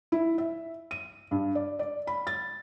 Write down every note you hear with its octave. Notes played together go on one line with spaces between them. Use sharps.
E4
E5
D#7
G2
D5
D5
B5
A6